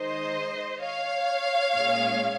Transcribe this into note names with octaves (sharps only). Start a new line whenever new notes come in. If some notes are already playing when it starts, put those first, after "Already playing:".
Already playing: D#3 G#3 D#4 C5 D#5
C#5 F5
A#2 G#3 C#4